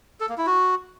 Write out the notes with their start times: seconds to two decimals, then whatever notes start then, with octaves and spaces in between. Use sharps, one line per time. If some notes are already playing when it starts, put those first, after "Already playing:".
0.20 A4
0.29 A#3
0.38 E4
0.46 F#4